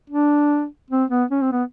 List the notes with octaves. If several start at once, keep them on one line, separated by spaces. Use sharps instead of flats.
D4
C4
B3
C#4
C4
B3